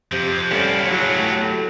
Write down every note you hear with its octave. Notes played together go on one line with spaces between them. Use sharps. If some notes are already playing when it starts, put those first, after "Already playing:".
F2 C3 F3
A2 G3 A#3 B3 C#4 E4
F#3 E4 G#4 C#5
A3 F#4 G4